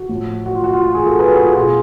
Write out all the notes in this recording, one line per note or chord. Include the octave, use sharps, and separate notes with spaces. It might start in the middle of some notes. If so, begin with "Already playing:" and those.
Already playing: F#4
A2 F3
F#4
F4
F#4
F4
F#4
F4 G#4
F#4 A4
G#4 B4
F#4 A4
F4 G#4
F#4
B2 F4 G#4